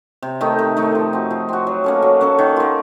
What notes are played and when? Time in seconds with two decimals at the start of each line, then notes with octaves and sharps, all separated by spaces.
0.22 C3
0.41 D#3 A3 D#4
0.59 C3
0.77 D#3 A3 D#4
0.95 F3
1.13 C4 F#4
1.31 F3
1.49 C4 F#4
1.67 F#3
1.84 A#3 C#4 A4
2.02 F#3
2.21 A#3 C#4 A4
2.39 D#3
2.56 A#3 F4